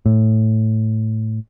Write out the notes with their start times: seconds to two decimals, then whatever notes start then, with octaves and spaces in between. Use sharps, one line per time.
0.06 A2